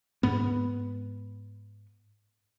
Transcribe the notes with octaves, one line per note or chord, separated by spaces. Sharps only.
G#2 B3